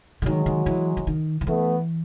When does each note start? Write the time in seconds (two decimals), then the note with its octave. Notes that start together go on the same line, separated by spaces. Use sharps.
0.22 D3
0.25 D#3 F#3 G#3
0.46 D#3
0.66 E3
0.97 E3
1.07 D#3
1.41 D#3
1.47 E3 A3 B3